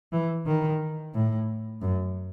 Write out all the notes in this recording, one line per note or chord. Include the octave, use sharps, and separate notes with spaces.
E3
D#3
A2
F#2